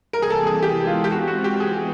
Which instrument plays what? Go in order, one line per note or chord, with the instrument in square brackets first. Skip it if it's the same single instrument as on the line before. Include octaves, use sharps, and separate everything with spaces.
[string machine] C3 E3 G3 A#3 [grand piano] A#4
[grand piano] G#4
A4
G#4
[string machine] E3 G#3 B3 E4 [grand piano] G4
[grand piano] F4
G4
[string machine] E3 G#3 C4 F4 [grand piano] F#4
[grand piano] F#4
G4
[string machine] E3 G#3 B3 [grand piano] G#4